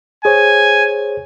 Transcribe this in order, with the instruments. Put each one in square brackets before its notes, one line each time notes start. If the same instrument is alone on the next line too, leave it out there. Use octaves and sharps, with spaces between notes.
[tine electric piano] G#4 C5 C#5 [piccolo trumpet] G#5